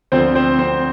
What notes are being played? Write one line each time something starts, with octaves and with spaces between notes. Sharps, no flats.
D2 D3 F3 C4 C5
C4 C5
C4 C5